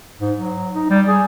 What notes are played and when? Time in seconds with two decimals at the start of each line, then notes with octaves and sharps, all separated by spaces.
0.21 G#2
0.39 F#3
0.75 D#4
0.90 G3
1.08 G#4